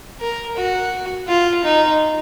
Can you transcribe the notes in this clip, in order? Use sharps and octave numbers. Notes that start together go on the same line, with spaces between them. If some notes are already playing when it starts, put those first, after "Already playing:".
A#4
F#4
F4
D#4